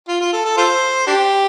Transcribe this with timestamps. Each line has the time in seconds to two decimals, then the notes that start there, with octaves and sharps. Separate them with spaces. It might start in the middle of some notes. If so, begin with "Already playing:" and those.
0.08 F4
0.21 F4
0.33 A4
0.45 A4
0.57 F4 A4 C5
1.07 D4 G4